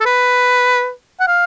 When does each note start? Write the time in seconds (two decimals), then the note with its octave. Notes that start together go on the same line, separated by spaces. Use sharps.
0.01 A4
0.06 B4
1.20 F#5
1.27 F5